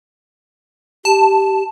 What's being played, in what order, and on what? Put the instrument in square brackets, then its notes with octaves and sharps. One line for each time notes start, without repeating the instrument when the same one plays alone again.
[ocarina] G4 [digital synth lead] A5